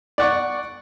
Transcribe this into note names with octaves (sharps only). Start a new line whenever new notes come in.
D5 F#5 C#6